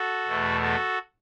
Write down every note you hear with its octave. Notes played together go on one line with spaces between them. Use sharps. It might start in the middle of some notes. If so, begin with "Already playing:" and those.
Already playing: F#4 A4
E2 B2 A3
F#4 A4